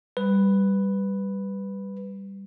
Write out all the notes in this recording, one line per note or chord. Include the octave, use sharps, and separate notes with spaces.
G3 B4